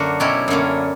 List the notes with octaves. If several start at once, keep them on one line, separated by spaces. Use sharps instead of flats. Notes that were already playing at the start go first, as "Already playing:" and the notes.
Already playing: F#2 D3 A#3 F#4
B2 F#3 C#4 E4 G4
F#2 D3 A#3 C#4